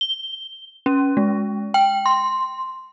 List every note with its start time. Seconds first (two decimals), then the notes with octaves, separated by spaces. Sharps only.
0.01 G7
0.86 C#4
1.17 G#3
1.74 G5
2.06 C6